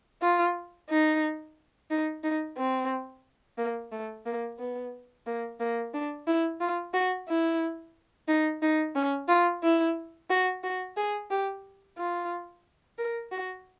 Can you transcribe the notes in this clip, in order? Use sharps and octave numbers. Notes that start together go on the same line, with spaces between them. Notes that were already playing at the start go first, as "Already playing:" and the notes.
F4
D#4
D#4
D#4
C4
A#3
A3
A#3
B3
A#3
A#3
D4
E4
F4
F#4
E4
D#4
D#4
C#4
F4
E4
F#4
F#4
G#4
G4
F4
A#4
F#4